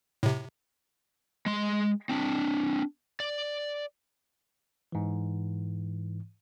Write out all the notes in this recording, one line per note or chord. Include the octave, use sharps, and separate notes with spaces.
A2 C3
G#3 C6
C4 D4
D5
G#2 E3